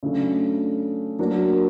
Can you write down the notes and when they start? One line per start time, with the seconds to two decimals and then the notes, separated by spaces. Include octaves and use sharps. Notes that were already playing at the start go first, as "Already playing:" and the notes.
0.03 C#3 F#3 A3 D4
1.19 F#3 A#3 D4 F#4 A#4